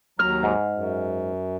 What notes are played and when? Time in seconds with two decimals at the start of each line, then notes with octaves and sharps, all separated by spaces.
0.19 D#2 F#3 A#5 F6
0.43 G#2
0.75 F#2